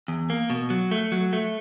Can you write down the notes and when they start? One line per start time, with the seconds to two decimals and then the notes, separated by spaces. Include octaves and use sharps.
0.08 E2
0.30 A#3
0.50 B2
0.70 F#3
0.91 A3
1.12 F#3
1.33 A3